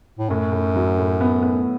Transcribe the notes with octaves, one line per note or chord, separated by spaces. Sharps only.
A2
F#2 A2
A2
F#3
A2
B3
B3